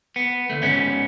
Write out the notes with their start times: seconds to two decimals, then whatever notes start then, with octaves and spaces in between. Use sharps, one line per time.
0.16 B3
0.50 D2 A3
0.63 G#2 B3 C#4